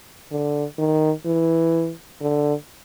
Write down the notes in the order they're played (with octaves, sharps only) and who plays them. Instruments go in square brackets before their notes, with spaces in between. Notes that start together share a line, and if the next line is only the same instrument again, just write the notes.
[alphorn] D3
D#3
E3
D3